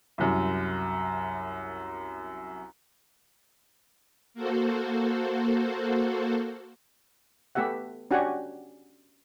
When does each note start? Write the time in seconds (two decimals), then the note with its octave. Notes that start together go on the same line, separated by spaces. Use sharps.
0.18 C2 F#2
4.34 A#3 F#4 A4 C5
7.55 A3 B3 G4 E5 F#5
8.11 C#4 D4 F#4 G4 F#5 G#5